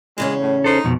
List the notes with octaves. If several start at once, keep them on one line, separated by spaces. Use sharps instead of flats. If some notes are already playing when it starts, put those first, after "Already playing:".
E2 C#3 G#3 C#4
A2
D#4 A4 C5
F2 B2